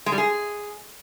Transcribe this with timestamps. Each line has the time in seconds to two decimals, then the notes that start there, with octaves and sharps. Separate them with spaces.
0.06 G#3
0.12 G3
0.18 G#4